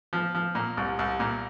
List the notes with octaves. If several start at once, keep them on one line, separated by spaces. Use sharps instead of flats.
F3
F3
A#2
C2
C2
A#2